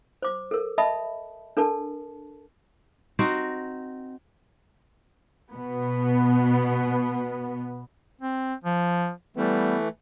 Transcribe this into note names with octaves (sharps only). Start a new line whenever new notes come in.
C5 D6
A4 A#4
D#5 E5 A5 B5 D#6
D4 A4 A#4 A5
C4 D#4 F#4
B2 B3
C4
F3
E3 G3 A3 B3